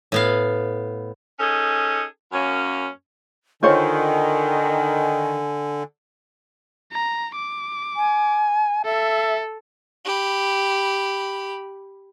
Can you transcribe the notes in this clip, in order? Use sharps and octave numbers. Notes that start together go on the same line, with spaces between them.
A2 B3 F5
C#4 D#4 G#4 A4
F#2 A#3 C#4
D3 D#3 F4 C5 C#5 G#5
A#5
D6
G#5
A4 E5
G4 B5